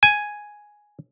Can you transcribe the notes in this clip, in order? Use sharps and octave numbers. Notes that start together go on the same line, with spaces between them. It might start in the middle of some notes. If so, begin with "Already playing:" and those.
G#5